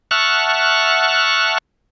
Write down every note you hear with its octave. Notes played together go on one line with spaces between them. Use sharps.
E5 F#5 A5 C#6 F6 F#6